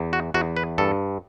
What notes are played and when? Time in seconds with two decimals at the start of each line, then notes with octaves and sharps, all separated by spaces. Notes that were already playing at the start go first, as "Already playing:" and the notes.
Already playing: E2
0.13 F#4
0.34 E2 F#4
0.57 B4
0.78 G2 A4